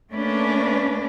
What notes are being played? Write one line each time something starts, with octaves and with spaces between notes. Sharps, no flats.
A3 A#3 C#4 D4 B4